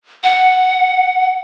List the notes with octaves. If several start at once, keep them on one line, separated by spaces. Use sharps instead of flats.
F#5